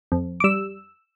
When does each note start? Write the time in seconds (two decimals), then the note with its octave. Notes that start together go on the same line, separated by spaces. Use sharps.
0.12 F2
0.40 D6
0.44 G3 E6